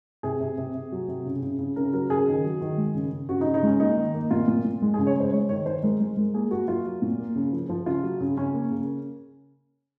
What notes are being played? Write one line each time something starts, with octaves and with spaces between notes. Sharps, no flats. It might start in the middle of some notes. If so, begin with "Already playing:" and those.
C3 G#4
C3
C3
C3
F#3
C3
C#3
C#3
C#3
C#3 A#4
F#3 A#4
C#3 G#4
D#3
F#3
D#3
G#3
C#3
C#3
C#3 F#4
D#4
C#3
D#4
G#3 C#4
A#3 D#4
D#3
A#3
A#2 F4
A#2
A#2
G#3
G#4
C#3
C#5
G#3
C5
G#3 C#5
D#3 C#5
D#3 C5
G#3 A#4
G#3
G#3
A#3 G#4
A#3 F#4
F#3 F4
F#3
A#2
A#3
C#3
F3
F3
C#3 F4
F#3
C#3
C#3 C#4
A#3
C#3